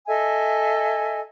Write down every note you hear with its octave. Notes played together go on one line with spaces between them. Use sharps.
A4 D#5 E5 G#5